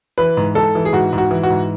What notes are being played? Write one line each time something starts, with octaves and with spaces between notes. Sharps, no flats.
E3 B4
G#2
G#2 A4
E3
G#4
G#2 F#4
G#2
F#4
E3
F#4
G#2